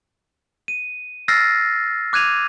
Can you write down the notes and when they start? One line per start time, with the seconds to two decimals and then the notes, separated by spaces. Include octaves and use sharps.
0.68 D#7
1.28 E6 F6 A6 A#6 C7
2.13 D6 F#6 G#6 D#7 F7